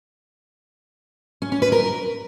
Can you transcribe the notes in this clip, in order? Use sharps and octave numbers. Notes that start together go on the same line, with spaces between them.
C#4
C#4
B4
A#4